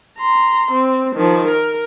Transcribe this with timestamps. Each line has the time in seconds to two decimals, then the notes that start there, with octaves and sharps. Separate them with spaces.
0.19 A#5 C6
0.72 C4
1.16 D#3 F3
1.48 A#4